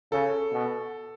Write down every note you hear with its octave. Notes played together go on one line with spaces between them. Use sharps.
C#3 A4
B2